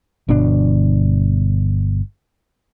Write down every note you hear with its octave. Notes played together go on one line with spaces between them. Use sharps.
G1 B2 D4